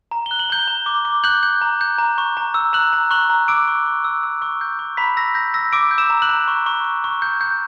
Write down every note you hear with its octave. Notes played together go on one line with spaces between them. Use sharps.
A#5
F#6 G7
F#7
A#5 G6 G7
A#5
D6
D6
F#6 G6 F#7
G6
A#5
G6
A#5
C#6
A#5
E6
A#5 F#6 F#7
A#5
C#6 F#6 F#7
A#5
D6 E6 D7
C#6
C#6
E6
E6
C#6
G6
C#6
A#5 B5 B6
E6 A#6
G6 A#6
E6 A#6
D6 E6 D7
G6
E6 E7
A#5
F#6 F#7
A#5
C#6
C#6
C#6
C#6
G6
G6